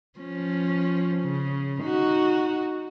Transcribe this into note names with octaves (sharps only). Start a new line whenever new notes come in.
F3 C#4
C#3
D#4 F#4